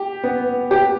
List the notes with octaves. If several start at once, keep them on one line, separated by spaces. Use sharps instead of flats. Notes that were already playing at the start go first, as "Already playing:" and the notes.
Already playing: G4
B3
G4